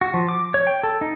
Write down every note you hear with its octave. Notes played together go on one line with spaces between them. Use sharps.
F#4
F3
D6
C#5
G5
A4
D#4